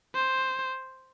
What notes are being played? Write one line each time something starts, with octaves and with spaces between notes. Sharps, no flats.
C5